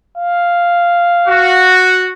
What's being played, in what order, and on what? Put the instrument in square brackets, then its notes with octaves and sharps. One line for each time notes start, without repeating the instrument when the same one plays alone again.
[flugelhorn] F5
[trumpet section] F#4